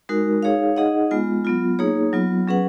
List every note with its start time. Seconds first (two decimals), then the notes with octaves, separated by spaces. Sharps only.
0.09 G#3 D#4 F#4 A#4
0.43 D#4 G#4 C#5 F5
0.77 D#4 G#4 D#5 F#5
1.11 G#3 B3 F4
1.45 F#3 B3 F4
1.79 A#3 D#4 G#4 C#5
2.13 F#3 B3 F4
2.48 F#3 C#4 G#4 B4 F#5